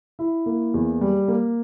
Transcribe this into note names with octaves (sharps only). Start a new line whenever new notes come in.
E4
A#3
E2
G3
A#3